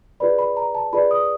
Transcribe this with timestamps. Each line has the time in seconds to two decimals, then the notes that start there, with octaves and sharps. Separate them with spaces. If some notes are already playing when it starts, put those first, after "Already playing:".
0.20 F4 G#4 B4 D5 B5
0.39 B5
0.57 A#5
0.75 A5
0.93 F4 G#4 B4 D5 B5
1.11 D#6